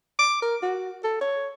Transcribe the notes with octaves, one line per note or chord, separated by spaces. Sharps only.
D6
A#4
F#4
A4
C#5